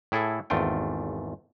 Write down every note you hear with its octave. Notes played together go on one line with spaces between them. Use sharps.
A2 E4 G#4 A4 E5
G#1 E2 A3 F4 G5